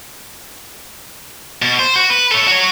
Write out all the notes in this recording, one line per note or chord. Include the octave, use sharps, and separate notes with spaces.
B2
C5
F#4
B4
A4 C#5
F#4 C#5